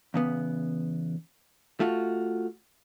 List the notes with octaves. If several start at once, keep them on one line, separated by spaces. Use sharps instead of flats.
E2 C#3 B3
A3 F4 F#4